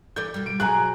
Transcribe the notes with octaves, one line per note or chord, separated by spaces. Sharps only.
E3 A4 D5 G6
B2 G3
D7
B2 F#3 G#4 G#5 A#5 F#6